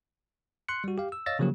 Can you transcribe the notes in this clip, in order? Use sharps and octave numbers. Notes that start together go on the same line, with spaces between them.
C6 F#6 C#7
G3 F#4
G4 F5
E6
C#5 D#5 F5 E6 A6 A#6
C#3 F3 F#3 A#3 G4